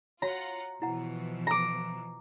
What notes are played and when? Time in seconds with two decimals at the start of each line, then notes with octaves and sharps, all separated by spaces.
0.22 F4 F#4 C#5 F#5 A#5
0.82 B2 E3 F3 E4 F#5
1.47 A#5 D6